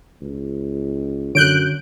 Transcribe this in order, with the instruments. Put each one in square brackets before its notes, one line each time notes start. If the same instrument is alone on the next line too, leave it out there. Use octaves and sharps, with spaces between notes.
[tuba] C#2
[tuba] F#2 [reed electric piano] D3 C#5 [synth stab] F#6 G6 D7